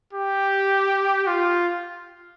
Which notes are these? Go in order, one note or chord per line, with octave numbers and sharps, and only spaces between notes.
G4
F4